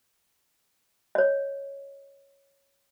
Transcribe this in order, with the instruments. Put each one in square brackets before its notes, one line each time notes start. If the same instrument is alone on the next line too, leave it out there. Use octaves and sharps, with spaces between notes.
[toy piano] C#5 D#5